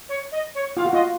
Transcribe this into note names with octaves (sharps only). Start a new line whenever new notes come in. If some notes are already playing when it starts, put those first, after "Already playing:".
C#5
D#5
C#5
F4 F5
F#4
F4 D#5